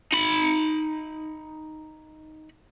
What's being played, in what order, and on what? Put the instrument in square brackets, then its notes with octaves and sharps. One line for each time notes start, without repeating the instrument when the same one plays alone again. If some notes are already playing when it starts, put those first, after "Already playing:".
[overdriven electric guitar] D#4 B5